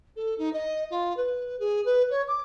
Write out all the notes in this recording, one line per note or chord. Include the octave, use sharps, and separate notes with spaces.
A4
D#4
D#5
F4
B4
G#4
B4
C#5
D6